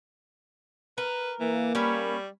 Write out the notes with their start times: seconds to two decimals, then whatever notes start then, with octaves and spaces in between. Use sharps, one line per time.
0.98 A#4 B4
1.40 E3 A#3
1.75 G3 C#4 B4 C#5